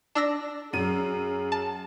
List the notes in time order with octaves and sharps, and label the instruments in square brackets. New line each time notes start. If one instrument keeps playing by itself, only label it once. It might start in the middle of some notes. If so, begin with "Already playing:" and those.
[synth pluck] D4 E6 A#6
[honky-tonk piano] F#2 D#7 [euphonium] G#4
[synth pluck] A5